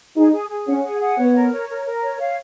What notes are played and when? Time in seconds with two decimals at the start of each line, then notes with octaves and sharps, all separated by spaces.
0.17 D#4 G#4
0.33 G#4
0.50 G#4
0.67 C#4 F#5
0.84 G#4
1.01 F#5
1.18 B3 C#5
1.35 A#4
1.52 C#5
1.69 A#4
1.86 A#4
2.02 C#5
2.20 F5